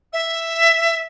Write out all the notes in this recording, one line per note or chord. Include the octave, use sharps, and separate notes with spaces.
E5